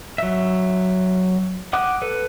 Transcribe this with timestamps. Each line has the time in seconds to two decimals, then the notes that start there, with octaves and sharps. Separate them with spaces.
0.18 F#3 E5
1.73 F#5 G5 D6 D#6 F#6
2.02 A4 B4